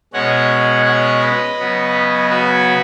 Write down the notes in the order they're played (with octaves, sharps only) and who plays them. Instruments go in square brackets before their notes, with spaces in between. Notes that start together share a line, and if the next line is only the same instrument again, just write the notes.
[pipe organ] B2 G#3 C#4 C#5 F#5
C#5 F#5
B4 D#5
C#3 F#3 B3
F#4 B4